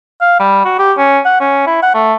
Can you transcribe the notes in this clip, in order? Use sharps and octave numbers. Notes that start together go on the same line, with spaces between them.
F5
G3
F#4
G4
C#4
F#5
C#4
E4
F#5
A3